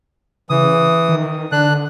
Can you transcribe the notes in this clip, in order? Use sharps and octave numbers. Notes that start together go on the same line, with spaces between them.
C#3 E3 D#6
D#3
D3 D4 F#6